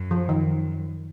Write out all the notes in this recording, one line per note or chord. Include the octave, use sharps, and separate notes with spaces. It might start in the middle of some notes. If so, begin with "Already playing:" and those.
Already playing: F#2
F3
D#3